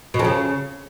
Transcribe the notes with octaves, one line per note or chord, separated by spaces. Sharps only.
B2
F2
C#3